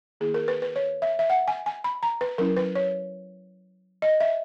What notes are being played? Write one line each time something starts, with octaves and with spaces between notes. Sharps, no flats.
D#3 A#3 E4 G#4
A#4
B4
B4
C#5
E5
E5
F#5
G#5
G#5
B5
A#5
B4
F#3 C#4 E4 A#4
B4
C#5
D#5
E5